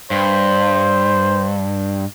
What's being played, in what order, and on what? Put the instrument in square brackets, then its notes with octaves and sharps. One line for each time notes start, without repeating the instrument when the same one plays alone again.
[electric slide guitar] G2 [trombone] C5